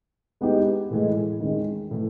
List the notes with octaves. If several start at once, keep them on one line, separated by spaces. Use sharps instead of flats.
G#3 B3 D#4 G4
A2 E3 G#3
D#3 G#3 C#4
A2 E3